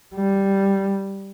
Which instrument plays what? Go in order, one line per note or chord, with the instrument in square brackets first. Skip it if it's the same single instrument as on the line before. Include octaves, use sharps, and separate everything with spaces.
[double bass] G3